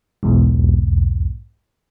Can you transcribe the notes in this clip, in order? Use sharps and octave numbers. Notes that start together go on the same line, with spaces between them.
B1 E2 G#2